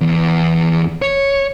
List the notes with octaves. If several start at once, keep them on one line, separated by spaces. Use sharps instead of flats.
E2
C#5